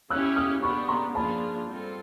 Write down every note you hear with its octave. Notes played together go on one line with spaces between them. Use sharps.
C#4 E4 G4 E6 F#6
D#6 F6
B3 D4 G4 B5 C#6
A#5 C6
F3 A#3 D4 F4 G#4 A5 B5
G3 C4 F4 A4